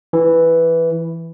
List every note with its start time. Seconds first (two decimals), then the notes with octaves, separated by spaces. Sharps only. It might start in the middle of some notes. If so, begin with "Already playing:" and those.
0.13 E3